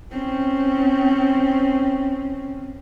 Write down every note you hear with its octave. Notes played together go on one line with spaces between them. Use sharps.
C4 C#4